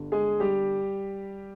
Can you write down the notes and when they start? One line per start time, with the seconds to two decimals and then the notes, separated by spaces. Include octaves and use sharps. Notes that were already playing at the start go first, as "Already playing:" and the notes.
Already playing: G1 G2 D3
0.12 G#3 G#4
0.40 G3 G4